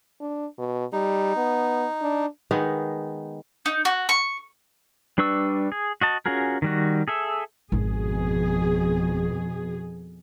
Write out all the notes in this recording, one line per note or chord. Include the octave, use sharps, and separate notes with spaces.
D4
B2
G3 D#4
B3
D4
D#3 G#3 B3 D#4
D#4
F#4
C#6
G3 D4 B4 C#6 E6
G#4
F#4 D#5 A5
C#4 F4 F#4 G#4 A#4
D#3 G3 F#4
G#4 A4 E5
G#1 F2 B2 G#4